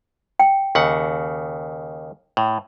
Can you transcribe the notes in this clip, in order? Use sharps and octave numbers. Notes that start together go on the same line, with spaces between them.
G5
D#2 C#3 F#5
A2